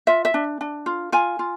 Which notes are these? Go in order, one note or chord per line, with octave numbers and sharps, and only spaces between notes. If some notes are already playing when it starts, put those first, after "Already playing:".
F4 E5
E5
D4
D4
F4
F4 G#5
F4